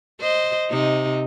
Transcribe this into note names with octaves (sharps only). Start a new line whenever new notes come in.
C5 D#5
C3 D#4